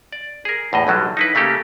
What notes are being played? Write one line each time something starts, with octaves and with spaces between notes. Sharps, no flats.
D5
G#4 A#4
E2 A2 D#5
B1 D3 F#3 G3
D#4 E4 B4
C#3 A3 A#3 G4 A4